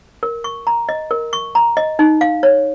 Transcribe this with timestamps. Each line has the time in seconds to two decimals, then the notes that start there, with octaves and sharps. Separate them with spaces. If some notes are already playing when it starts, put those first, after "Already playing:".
0.23 A#4
0.44 C#6
0.67 A#5
0.89 D#5
1.11 A#4
1.33 C#6
1.55 A#5
1.77 D#5
1.99 D#4
2.21 F5
2.43 C#5